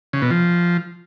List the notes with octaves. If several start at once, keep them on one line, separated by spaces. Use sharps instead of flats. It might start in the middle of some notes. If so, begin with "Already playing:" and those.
C#3
B2
F3